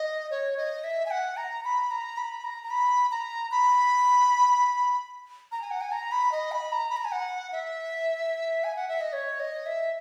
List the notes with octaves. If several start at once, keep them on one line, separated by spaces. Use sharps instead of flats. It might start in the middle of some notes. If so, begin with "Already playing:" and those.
Already playing: D#5
C#5
D#5
E5
G#5
F#5
A#5
B5
A#5
B5
A#5
A#5
B5
A#5
B5
A#5
G#5
F#5
G#5
A#5
B5
D#5
B5
A#5
B5
A#5
G#5
F#5
E5
G#5
F#5
E5
D#5
C#5
D#5
E5